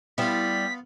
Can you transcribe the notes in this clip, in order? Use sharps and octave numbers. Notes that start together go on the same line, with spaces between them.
G3 B3 E4 F4 B6